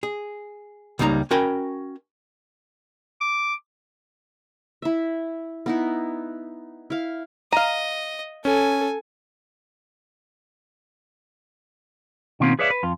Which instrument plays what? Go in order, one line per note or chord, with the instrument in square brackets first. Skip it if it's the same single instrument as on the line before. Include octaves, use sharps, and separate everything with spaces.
[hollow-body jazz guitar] G#4
C#2 G3 A#3 D#4 A#5
C#4 F#4 A#4 G5 G#5 B5
[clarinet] D6
[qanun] E4 E5
B3 D#4 E4
E4 F5
[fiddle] D#5 [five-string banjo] F5 A#5 [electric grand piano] D#7
[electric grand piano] C#4 [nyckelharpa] A4 [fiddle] G#5
[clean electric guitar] B2 D#3 A#3 C4 C#4 F4
G#4 B4 C#5 D5 E5 F5
B4
F2 F4